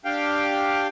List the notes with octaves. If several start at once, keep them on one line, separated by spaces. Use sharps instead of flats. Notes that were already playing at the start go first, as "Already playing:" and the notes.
D4 G4 F5 G5